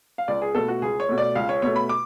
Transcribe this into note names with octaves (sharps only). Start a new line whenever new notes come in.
F5
C#2 D5
G#4
B2 A3 A4
F#4
C#2 G#4
C#5
B2 A3
D5
C#2 F5
C#5
B2 A3 C#5
B5
D6